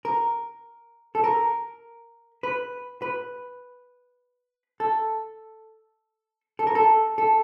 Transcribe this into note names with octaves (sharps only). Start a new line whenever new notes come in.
A#4
A4
A#4
B4
B4
A4
A4
A#4
A4
A4